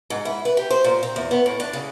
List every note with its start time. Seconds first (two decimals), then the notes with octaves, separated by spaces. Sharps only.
0.10 G#2
0.25 E4
0.45 B4
0.57 G4
0.70 C5
0.84 A#2
1.03 C4
1.16 E2
1.31 B3
1.46 A2
1.60 D4
1.73 C#3